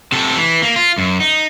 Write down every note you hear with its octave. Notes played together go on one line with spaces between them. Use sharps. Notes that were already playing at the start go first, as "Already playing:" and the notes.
C3 A4
E3
A#3
F4
F#2
D#4